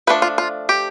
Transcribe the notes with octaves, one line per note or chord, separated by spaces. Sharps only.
F3 A3 D4 B4
F4
F4
G4